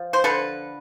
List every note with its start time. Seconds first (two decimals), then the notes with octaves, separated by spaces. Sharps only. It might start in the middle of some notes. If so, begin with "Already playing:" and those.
Already playing: F3
0.13 C5
0.24 D3 A4 B4